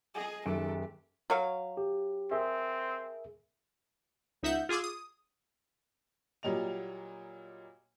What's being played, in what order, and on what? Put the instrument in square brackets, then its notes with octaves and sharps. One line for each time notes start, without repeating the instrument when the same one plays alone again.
[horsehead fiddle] G#4 D#5 [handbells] G#5
[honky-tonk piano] F#1 D#3 D7 [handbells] C#4 G4 E5 [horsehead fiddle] A4
[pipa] F#3 C#5 F5
[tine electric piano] G4
[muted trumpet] C4 [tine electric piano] G#4 A#4 E5
[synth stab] C#2 D#4 E5 F#5 G6
F4 G#4 C6 D6 E6
D#6
[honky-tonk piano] A#2 F#3 G3 D#5 F7